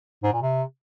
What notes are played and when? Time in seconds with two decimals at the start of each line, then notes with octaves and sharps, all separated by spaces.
0.23 G#2
0.33 A#2
0.42 C3